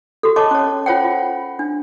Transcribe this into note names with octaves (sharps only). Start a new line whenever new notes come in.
F#4 G4 A4
A4 C#5 D#5 A5 C#6 D6
C#4 C#5
F4 C5 C#5 F#5 G5
F4
D4